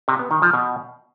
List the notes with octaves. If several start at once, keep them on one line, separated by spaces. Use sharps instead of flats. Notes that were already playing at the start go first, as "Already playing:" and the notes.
C3
B3
D#3
F3
B2